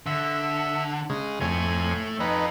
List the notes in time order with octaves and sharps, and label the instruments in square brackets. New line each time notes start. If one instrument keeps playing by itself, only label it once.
[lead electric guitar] D3 [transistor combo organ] E5
[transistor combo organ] C#3 G#3
[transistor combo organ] F2 G#5 [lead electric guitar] A3 C#5
[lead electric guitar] F2 [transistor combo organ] D#4 B4